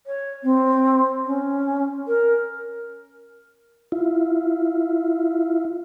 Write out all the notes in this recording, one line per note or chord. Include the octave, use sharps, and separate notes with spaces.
C#5
C4
C#4
A#4
E4 F4